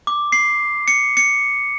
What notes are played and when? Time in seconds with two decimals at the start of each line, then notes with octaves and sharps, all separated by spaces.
0.07 D6
0.32 C7
0.88 C#7
1.17 C#7